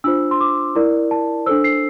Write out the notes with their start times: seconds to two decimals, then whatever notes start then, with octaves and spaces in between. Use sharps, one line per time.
0.04 D4 F4 C5 E6
0.31 C6
0.41 D6
0.75 E4 A#4 D5
1.11 A5
1.46 D4 A4 C5 E6
1.64 C7